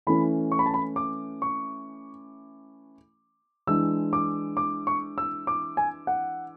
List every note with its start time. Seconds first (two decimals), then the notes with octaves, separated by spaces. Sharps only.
0.07 E3 A3 C#4 B5
0.52 C#6
0.59 B5
0.66 A5
0.74 B5
0.96 D6
1.42 C#6
3.67 E3 G#3 D4 E6
4.13 D6
4.57 D6
4.87 C#6
5.18 E6
5.47 D6
5.77 G#5
6.07 F#5